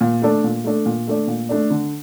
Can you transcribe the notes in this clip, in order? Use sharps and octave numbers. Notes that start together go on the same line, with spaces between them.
A#2
A3 D4 A4 D5
A#2
A3 D4 A4 D5
A#2
A3 D4 A4 D5
A#2
A3 D4 A4 D5
D3